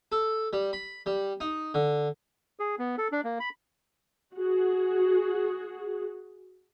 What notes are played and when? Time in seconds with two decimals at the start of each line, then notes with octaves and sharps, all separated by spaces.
0.12 A4
0.53 G3
0.73 B5
1.06 G3
1.40 D#4
1.74 D3
2.60 G#4
2.79 B3
2.98 A4
3.12 D4
3.24 A#3
3.40 B5
4.35 F#4 G#4